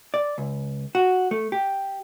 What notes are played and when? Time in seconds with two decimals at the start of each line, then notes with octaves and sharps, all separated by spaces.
0.14 D5
0.38 C#2
0.95 F#4
1.31 A3
1.52 G4